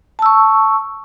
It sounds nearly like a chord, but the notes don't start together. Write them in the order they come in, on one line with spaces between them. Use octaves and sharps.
A5 E6 C#6